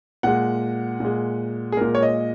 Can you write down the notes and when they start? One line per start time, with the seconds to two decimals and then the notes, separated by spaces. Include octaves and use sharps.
0.23 A#2 G#3 F#5
1.00 A#2 G#3
1.72 G#4
1.77 A#2 G#3 A#4
1.95 C#5
2.02 D#5